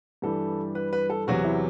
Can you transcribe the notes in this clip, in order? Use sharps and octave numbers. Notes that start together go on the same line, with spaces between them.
G2 E3 G3 A4
B4
B4
A4
E2 C3 F#3 F#4
E4